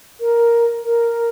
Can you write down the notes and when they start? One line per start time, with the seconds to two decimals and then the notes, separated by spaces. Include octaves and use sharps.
0.20 A#4
0.84 A#4